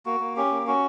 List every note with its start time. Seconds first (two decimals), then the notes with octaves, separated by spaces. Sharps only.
0.06 A#3 F#4
0.20 A#3
0.36 C#4 G4
0.51 A#3
0.67 C#4 F#4